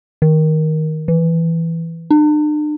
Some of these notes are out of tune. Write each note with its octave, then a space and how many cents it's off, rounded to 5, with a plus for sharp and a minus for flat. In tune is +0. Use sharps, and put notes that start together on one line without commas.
D#3 +10
E3 +5
D4 +45